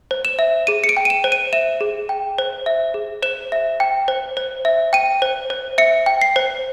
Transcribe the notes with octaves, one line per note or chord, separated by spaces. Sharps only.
C5
E7
E5
G#4 D#7
C#7
D7
G5
D#7
E7
C5
D#7
E5 E7
G#4
G5
C5
E5
G#4
C5 E7
E5
G5
C5
C5
E5
G5 D#7
C5
C5
E5 C#7
G5
C7
C5